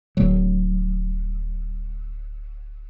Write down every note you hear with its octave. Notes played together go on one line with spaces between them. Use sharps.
D1 F#3